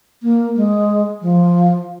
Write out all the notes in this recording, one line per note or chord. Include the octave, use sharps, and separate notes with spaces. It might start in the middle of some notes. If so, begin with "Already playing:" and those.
A#3
G#3
F3